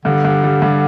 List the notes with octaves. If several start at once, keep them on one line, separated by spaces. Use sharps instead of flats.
G2 D3
G2
G3
G2